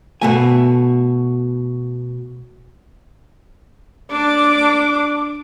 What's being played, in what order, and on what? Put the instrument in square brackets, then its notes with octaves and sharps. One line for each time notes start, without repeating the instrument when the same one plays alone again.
[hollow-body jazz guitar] B2 A3 G#5
[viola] D4 D6